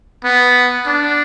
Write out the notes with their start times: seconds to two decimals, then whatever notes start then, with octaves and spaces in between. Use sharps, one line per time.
0.24 B3
0.86 D4